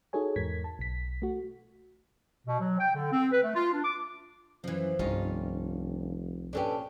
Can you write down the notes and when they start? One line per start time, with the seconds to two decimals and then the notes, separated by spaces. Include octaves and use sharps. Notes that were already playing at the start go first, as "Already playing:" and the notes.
0.13 D#4 F#4 G#4 A4 C#5 G#5
0.36 E2 G#2 A#4 G#6 B6
0.64 A5
0.79 B1 B6
1.22 A3 F#4
2.47 B2
2.60 F#3
2.79 G5
2.95 D3
3.13 C4
3.32 B4
3.43 A3
3.55 F4
3.73 D4
3.85 D6
4.64 F#2 E3 F3
4.99 F1 C2 G2 C#4 D#4 F4
6.53 A#2 C#4 D4 G4 A4 B4